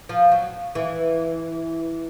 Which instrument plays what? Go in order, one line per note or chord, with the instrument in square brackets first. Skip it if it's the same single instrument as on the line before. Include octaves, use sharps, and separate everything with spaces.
[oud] F3
F#3
E3